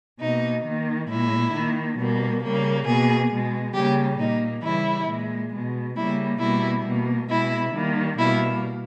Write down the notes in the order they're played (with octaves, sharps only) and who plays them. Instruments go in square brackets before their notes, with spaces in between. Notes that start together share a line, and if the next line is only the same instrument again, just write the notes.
[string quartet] B2 A#3 D#4
D#3 A#3
A#2 G#3 E4
D#3 A#3
B2 G3 A#3
C#3 G3 A#3
B2 A#3 G#4
B2 G#3
C#3 G3 A#3 G4
A#2 A#3 D#4
C#3 E3 G3 E4
A#2 G#3
B2 G#3
C#3 G3 A#3 E4
B2 G3 A#3 E4
B2 A#3
B2 G#3 E4
D#3 G3 A#3
B2 G3 A#3 E4